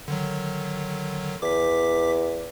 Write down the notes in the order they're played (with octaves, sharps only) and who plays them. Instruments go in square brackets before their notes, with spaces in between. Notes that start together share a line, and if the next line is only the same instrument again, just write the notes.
[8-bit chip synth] D3 D#3 F#3
[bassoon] E2 [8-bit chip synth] D6 B6